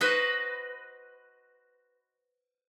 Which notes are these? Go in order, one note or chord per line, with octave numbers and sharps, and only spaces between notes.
F#4 B4 C5 D#5